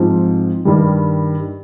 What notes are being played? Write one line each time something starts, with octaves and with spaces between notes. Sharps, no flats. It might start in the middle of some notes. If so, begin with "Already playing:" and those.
Already playing: G#2 F3 C4
G2 D#3 G3